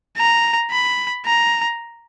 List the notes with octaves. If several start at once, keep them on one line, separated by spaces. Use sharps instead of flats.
A#5
B5
A#5